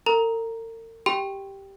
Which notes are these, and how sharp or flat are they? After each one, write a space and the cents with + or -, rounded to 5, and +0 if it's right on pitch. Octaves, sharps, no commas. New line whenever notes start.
A#4 -45 A#5 +0
G4 +0 G5 +0 C6 -15